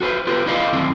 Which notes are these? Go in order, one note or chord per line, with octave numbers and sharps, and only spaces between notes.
F#4 A4 B4 C5
F4 G4 B4
E4 C5 D5 D#5 F5
F#2 D#3 C4 E4